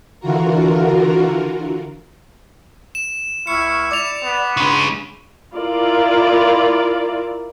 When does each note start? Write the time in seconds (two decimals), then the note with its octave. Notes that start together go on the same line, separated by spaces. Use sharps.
0.20 D3 E3 F4 F#4 A#4
2.95 E7
3.47 C#2 E4 C#6 F6 C#7
3.91 D5 D6 F7
4.24 B3
4.57 G2 C#3 G#3 D#4 B5
5.54 E4 F4 A#4 D5